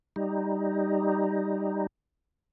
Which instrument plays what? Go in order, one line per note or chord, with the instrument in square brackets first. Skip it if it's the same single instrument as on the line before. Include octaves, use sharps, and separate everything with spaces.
[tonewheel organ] G3 D#4